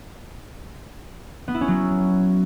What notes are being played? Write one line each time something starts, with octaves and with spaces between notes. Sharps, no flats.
B3
E4
C#4
F#3